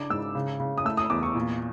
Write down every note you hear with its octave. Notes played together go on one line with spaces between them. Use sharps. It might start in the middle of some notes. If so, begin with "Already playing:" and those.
Already playing: C#3 D4 D6
G#2 E6
C#3
C#3
D#6
A3 E6
D#6
E2 D6
C#6
A#2